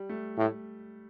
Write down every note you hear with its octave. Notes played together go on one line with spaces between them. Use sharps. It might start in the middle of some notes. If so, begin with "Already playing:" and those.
Already playing: G3
A3
A2